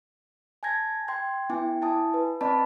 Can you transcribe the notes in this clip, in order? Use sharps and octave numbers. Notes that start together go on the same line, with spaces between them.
G#5 A5 G6 G#6 A#6
G5 C6 G6 G#6
B3 E4 G5 G#5 D6
E4 G#5 A5 D#6
B4
C4 B4 D5 D#5 A5 B5